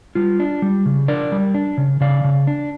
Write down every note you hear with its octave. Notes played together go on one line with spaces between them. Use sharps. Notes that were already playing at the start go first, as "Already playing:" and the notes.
G3 F4
D4
G3
C#3
D4 A#4 D5
G3
D4
C#3
C#3 D5 F5
C#3
D4